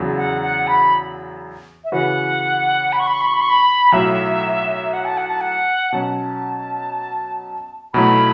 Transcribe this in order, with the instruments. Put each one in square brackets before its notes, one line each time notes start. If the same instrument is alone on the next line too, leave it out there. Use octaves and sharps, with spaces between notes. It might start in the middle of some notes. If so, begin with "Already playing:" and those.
Already playing: [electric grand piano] E2 C#3 F#3
[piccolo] F#5
F#5
B5
E5
[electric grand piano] C#3 E3 C#4 F#4 B4 [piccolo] F#5
[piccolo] B5
C#6
B5
C#6
B5
C#6
B5
C#6
B5
[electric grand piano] B1 A2 F#3 [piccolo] E5
[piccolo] F#5
A5
F#5
A5
F#5
[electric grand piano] B2 F#3 C#4 [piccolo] A5
[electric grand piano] B1 B2 F#3 A3 E4 [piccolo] B5